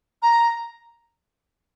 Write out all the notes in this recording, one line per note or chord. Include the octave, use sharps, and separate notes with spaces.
A#5